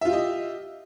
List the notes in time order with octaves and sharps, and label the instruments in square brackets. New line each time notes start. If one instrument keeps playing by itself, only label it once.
[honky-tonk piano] E5
F4
G4
D#5